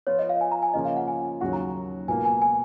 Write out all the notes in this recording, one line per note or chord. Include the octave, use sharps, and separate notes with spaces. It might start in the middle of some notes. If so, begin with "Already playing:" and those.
F3 B3 F4 C#5
D#5
F5
G#5
A#5
G#5
C#3 F3 A#3 C#4 F4 D#5
F5
F#5
G#5
D#2 C#3 F#3 C#4 F#4 F#5
A#5
C#2 B2 A#3 G#5
G#5
G#5